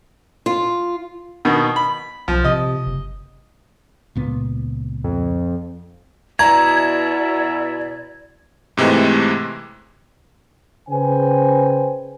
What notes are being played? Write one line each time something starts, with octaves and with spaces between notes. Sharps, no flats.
F4
B2 D#3
B5
B1 F3
C3 D#5
F#1
C#2 A#2 B3
F2
B2 E4 D5 A#5 G#6
G#2 C3 E3 G#3 A3
C#3 B4 C5 G5 G#5